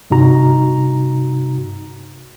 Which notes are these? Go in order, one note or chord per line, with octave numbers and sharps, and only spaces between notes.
G2 C3 D#4 F#4 A#5